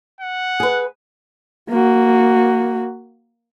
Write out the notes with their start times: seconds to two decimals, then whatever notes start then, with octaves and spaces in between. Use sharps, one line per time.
0.21 F#5
0.60 G#4 B4
1.70 A#3 F#4